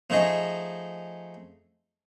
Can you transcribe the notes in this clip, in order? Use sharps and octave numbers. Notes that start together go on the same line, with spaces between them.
F3 A3 D#4 G#4 D#5